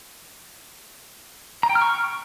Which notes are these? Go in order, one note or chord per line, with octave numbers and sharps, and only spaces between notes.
A#5
G5
F6
C#6